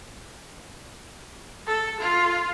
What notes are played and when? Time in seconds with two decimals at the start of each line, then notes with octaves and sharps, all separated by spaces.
1.67 A4
2.00 F4